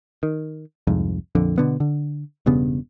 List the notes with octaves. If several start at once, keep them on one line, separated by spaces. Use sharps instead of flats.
D#3
C2 F2 G#2
A#1 F2 D3
B2 D3 B3
D3
E1 G2 C#3 B3